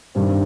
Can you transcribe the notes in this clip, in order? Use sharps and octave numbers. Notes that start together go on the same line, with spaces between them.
G2 D#3 G3 C4